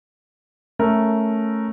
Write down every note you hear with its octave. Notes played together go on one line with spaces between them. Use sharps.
A3 C#4 A#4